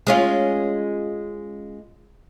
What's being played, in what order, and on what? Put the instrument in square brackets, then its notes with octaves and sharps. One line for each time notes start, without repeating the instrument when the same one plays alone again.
[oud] G#3 C#4 F4